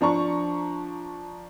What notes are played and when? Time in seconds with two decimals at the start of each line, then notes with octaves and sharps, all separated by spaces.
0.01 F3 D4 A#5 C#6